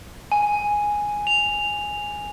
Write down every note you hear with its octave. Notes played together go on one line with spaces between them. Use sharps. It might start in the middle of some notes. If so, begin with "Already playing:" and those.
G#5
F7